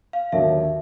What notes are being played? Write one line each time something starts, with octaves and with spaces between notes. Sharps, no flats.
F5
D#2 D3 F#3 E5